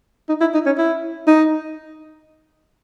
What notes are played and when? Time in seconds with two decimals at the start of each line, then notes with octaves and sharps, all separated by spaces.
0.29 D#4
0.41 E4
0.54 D#4
0.66 C#4
0.78 E4
1.27 D#4